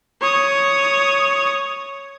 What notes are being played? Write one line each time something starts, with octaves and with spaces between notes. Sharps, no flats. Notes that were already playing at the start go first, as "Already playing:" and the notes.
C#5 D#6